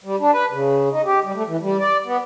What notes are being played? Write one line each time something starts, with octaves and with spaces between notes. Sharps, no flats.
G3
D4
B4
C#3
D#4
G4
G3
A3
E3
G3
D5
B3